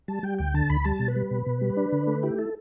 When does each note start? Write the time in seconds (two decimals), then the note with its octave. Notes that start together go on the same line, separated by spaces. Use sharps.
0.08 G3 A5
0.23 G3 G5
0.38 D2 G5
0.54 D3 A5
0.69 D2 B5
0.84 G3 A5
1.00 B2
1.08 B4
1.16 G3
1.31 B2
1.46 B2
1.61 G3
1.77 D4
1.92 D3
2.07 A3
2.23 E4 G4
2.38 E4 A4